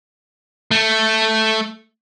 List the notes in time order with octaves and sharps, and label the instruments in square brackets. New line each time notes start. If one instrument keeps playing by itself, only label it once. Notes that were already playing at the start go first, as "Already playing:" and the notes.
[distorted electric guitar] A3